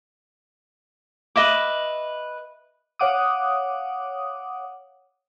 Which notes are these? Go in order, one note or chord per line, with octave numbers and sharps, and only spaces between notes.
B4 D#5 E5 D6
C#5 F5 F#5 D6 D#6